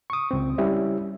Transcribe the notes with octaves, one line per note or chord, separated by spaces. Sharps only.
C#6 D#6
C#2 C4
G3 C#4 E4 G4 E5